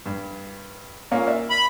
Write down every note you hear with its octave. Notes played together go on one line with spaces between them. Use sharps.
G2
A#2 A#3 C#4
A#4 D5 E5
B5